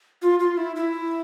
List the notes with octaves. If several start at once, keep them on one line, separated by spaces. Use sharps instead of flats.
F4
F4
E4
E4